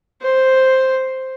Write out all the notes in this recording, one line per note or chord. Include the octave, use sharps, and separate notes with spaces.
C5